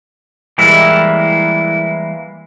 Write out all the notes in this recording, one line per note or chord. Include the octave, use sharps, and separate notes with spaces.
E3 G3 G#3 A#3 E4